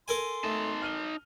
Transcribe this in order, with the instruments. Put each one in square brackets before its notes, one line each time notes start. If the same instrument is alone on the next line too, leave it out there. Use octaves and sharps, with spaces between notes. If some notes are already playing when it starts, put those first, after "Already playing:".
[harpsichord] A4 A#4 G#5 [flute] C6
[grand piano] A3 [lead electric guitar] D#4 A5
[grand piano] F6 D#7 G7